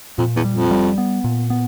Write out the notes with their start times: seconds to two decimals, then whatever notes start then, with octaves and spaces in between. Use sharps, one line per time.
0.18 F2 A#2
0.36 E2
0.44 G3
0.53 F2
0.71 G3
0.98 B3
1.24 A#2
1.50 B3